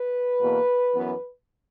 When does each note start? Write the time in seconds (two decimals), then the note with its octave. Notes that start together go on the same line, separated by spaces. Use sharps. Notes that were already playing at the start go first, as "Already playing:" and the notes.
Already playing: B4
0.39 E2 B2 A#3
0.93 F#2 E3 B3